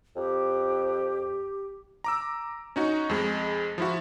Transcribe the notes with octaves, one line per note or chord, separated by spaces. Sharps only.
F2 G4
A#5 D6 E6
C#4 D#4 F#4
F2 G#3
F3 E4 F#4